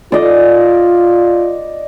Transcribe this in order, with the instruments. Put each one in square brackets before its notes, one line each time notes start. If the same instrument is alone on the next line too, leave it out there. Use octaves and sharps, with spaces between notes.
[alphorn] F4 [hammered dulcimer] D5 D#5